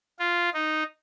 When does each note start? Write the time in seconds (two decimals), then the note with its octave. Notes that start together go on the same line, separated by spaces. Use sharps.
0.19 F4
0.54 D#4